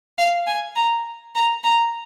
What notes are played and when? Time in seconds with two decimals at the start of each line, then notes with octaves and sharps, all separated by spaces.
0.18 F5
0.47 G#5
0.76 A#5
1.35 A#5
1.64 A#5